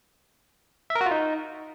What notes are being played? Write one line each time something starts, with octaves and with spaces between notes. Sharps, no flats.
E5
A#4
F#4
F4
D#4